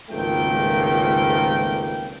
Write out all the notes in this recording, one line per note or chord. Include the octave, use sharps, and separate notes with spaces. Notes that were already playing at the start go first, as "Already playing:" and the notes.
G#1 C#2 F3 A3 A#3 G5